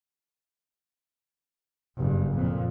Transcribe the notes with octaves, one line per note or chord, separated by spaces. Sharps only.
F#1 G2
F2 A#2